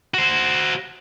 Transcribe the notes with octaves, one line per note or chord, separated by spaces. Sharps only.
F#4 C5